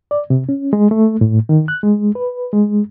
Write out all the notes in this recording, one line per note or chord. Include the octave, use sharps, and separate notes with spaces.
D5
C3
C#4
G#3
A3
A2
D#3
F#6
G#3
B4
G#3